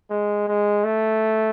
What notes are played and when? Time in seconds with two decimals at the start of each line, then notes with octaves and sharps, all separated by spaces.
0.10 G#3
0.48 G#3
0.84 A3